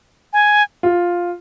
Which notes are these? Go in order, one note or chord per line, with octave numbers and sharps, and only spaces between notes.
G#5
F4